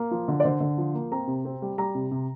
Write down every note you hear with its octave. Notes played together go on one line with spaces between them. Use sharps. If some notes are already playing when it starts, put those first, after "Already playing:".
Already playing: A#3
F3
D3
D5
D3 C5
D3
F3
A#3
C4 A#5
C3
C4
G3
G3 A#5
C3
C3